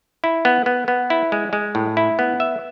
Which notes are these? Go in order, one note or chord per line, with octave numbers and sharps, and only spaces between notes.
E4
B3
B3
B3
E4
G#3
G#3
A2
E4
B3
E5